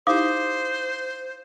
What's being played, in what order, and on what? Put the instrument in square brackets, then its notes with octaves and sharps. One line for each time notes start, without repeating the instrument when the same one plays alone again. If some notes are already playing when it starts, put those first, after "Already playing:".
[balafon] D#4 E4 G4 [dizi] C5 [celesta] F5 D6 D#6